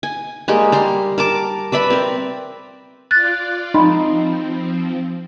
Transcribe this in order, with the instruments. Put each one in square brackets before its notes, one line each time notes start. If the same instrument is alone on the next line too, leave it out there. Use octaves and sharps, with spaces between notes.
[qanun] G#5
G3 G#3 A#3 G4
G3 A#5 C6
A#4 A5 D6
B4 D5 E5 B5
C4 A#4
[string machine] F4 D5 [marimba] F#6 A6
[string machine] F3 C4 [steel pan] D#4 [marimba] B5 C6